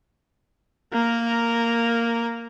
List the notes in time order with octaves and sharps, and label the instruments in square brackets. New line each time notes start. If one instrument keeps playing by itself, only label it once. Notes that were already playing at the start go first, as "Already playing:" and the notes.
[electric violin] A#3 A#4